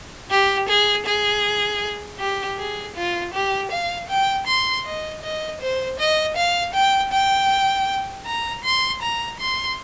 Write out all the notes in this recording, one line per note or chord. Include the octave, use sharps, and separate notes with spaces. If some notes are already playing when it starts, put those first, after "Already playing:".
G4
G#4
G#4
G4
G#4
F4
G4
F5
G5
C6
D#5
D#5
C5
D#5
F5
G5
G5
A#5
C6
A#5
C6